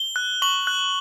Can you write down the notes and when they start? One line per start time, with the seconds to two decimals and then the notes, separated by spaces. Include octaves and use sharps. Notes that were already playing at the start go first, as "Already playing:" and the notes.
Already playing: G7
0.16 F#6
0.42 C#6 F#7
0.67 F#6